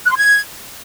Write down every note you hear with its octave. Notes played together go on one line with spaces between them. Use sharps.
F#6
C6
G#6